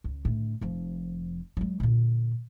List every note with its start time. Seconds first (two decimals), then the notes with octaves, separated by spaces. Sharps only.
0.04 C#2
0.25 A2 D3
0.61 F1 F3
1.57 F#3 G#3
1.80 A#2 D3